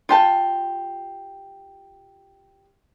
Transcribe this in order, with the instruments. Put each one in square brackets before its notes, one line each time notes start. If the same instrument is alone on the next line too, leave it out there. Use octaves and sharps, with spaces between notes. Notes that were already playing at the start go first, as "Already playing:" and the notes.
[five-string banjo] F4 G4 A5